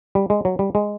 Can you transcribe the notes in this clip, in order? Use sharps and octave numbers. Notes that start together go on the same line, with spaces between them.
G3
G#3
F#3
G3
G#3